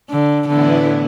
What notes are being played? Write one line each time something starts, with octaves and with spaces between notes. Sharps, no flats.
D3
A2 D3 E3 B3 E4